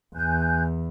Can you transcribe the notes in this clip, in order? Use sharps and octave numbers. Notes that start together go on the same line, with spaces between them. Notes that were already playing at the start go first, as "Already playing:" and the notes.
E2 G#5 F#6 G6